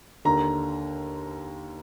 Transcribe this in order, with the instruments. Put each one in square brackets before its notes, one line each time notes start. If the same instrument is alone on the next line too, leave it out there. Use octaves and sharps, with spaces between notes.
[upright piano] D#2 D3 A#5